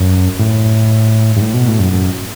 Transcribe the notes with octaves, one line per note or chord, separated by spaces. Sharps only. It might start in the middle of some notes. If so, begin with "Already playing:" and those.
Already playing: F#2
A2
G2
A2
B2
A2
F#2
F#2